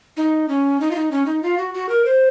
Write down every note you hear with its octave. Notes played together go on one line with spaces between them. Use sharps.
D#4
C#4
D#4
F4
D#4
C#4
D#4
F4
F#4
F#4
A#4
C5